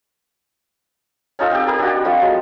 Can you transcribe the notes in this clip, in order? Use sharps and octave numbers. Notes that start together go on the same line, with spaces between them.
C#4 D#4 F4 A4
C4 G4
G4 A#4 B5
D4 F#4
F3 A3 C4 F4
F#3 G#3